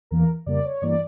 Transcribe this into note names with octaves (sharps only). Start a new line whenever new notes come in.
E2 E3 A#3 A#4
F2 C#3 G3 A#3 D5
C#5
G2 E3 A#3 D5